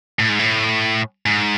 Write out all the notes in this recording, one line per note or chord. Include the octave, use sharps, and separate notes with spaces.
A2
G#2
A2
G#2